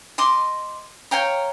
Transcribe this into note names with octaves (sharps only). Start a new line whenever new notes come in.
D#5 C6 D6
C#5 F5 G5 A#5